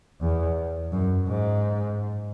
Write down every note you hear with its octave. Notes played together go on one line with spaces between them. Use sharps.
E2
F#2
G#2